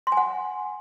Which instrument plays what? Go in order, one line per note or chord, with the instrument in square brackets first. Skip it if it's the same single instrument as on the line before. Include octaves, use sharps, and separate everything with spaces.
[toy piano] C6
G#5
F#5